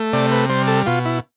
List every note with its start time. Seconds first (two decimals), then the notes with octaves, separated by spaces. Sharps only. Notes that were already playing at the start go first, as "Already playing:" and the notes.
Already playing: A3
0.13 C3 D5
0.32 B4
0.49 G3 C5
0.67 A4
0.86 B2 F4
1.06 E4